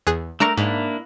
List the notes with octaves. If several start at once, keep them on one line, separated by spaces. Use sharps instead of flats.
E2 G#4 F#6
A3 D4 A#4 A#5 C#6
G#2 A#3 D4 E4